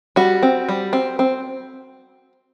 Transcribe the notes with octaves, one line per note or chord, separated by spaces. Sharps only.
G3 F#4
C4
G3
C4
C4